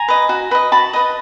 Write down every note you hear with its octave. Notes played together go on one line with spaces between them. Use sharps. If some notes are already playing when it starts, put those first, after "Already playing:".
Already playing: G#5 A#5
B4 D#5
F#4
B4 D#5
F#4 A5 B5
B4 D#5